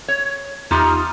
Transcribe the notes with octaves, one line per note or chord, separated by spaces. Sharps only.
C#5
E2 D#4 F4 G4 D#6 F6